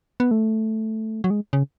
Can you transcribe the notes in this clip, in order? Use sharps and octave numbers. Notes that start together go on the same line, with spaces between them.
B3
A3
F#3
G#3
C#3